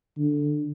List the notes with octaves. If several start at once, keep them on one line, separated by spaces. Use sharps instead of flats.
D3